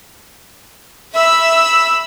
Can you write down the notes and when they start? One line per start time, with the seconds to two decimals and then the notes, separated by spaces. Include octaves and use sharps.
1.15 E5 B5 E6